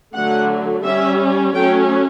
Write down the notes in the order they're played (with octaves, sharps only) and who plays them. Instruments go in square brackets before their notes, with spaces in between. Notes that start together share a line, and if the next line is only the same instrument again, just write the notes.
[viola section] D3 F#3 A3 F#5
G3 C#4 E5
F#3 A3 C#4 G5